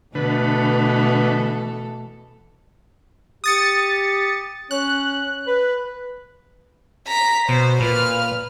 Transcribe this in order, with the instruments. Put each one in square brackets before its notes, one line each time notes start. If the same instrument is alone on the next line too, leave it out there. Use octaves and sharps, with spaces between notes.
[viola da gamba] B2 A4 [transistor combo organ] D3 B4 [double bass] E3 A3
[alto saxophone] G4 [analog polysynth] D#6 A6 C#7
[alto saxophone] C#4 [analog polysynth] F#6
[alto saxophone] B4
[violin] A#5 B6
[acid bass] B2 [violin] C5
[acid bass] A#2 [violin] B4 F6